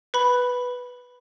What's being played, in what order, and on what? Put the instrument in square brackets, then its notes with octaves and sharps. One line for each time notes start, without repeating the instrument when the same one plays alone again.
[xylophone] B4 B5